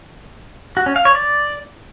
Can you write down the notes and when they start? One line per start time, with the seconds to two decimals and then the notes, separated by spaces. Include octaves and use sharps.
0.77 F#4
0.86 C#4
0.96 F5
1.05 C#5
1.15 D5